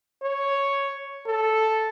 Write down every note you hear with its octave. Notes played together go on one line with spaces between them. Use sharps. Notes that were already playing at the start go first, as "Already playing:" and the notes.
C#5
A4